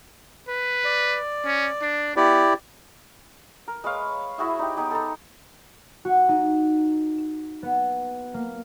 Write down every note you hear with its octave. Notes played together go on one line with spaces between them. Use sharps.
B4
D5
C#4
D4
B3 E4 G4 D5
A#4
G#3 B4 C#5 F5
E4 F#4 G#4 E5
D#4 G4
B3 D#4 G4 G#4
A4 C5 A#5
F#4
D#4
E7
B3
A#3